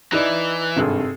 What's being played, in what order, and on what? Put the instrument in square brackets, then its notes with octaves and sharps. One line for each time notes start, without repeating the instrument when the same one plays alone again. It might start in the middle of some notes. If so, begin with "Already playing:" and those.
[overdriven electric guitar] E3 [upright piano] D#4 E4 D5
[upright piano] G#1 G2 [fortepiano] C3 G#4 A4